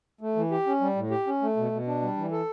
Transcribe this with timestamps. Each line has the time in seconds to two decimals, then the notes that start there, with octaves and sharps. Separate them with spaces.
0.21 A3
0.36 E3
0.51 G4
0.67 C#4
0.81 G3
0.96 A2
1.11 G4
1.27 C#4
1.42 A3
1.57 B2
1.72 B2
1.87 D4
2.02 G3
2.17 E3
2.32 A4